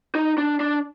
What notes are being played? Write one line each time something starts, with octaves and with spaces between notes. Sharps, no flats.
D#4
D4
D4